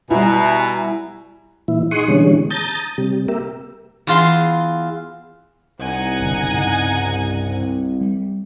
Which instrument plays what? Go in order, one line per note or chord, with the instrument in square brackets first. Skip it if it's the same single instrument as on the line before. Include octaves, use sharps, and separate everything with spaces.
[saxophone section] B2 [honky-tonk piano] G3 E4 [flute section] G#5 A#5 B5
[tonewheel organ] A#2 E3 E4
D#4 G#4 F#5 C6 C#6 D#6
B2 D3 E3 G3 G#3 C#4
A5 A#5 D#6 G6 A6
C3 G3
A#3 G4 A#4 E5
[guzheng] E2 F4 C6
[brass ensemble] C2 [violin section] D#4 F#5 G#5
[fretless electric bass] F#1 B2 D3
G2 C#3 G3
G3